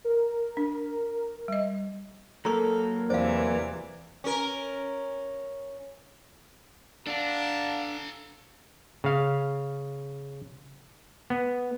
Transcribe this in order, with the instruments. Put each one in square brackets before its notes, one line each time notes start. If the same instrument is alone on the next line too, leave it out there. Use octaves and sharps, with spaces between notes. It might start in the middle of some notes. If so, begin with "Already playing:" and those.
[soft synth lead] A#4
[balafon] D4
G3 D#5
[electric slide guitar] F#3 A#3 A#4 [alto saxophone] A4 [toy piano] A#5 C#6
[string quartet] E2 C3 E3 [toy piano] C5 F5 [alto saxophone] D5
[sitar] C#4 A#4
[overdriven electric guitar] D4 [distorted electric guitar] A4 A#5 [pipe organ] F5 F#5 [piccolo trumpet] A5
[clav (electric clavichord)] C#3 F5
B3